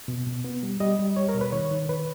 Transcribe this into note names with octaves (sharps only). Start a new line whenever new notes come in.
B2
B2
B3
G3
G3 D#5
G3
G3 C#5
A#4
B2
B4
D#3 C#5
D#3
D#3 B4